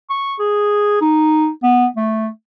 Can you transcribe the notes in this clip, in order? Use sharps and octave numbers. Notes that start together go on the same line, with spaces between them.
C#6
G#4
D#4
B3
A3